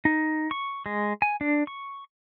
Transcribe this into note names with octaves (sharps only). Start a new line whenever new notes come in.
D#4
C#6
G#3
G#5
D4
C#6